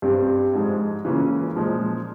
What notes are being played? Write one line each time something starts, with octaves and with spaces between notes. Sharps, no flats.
G2 G3 C4
G#2 F3 G#3
C#3 E3 A#3 C#4 F4
A#2 F3 G#3